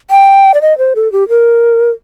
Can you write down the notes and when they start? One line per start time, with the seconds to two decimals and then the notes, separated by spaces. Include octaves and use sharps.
0.11 G5
0.54 D5
0.61 D#5
0.78 C5
0.95 A4
1.12 G4
1.29 A#4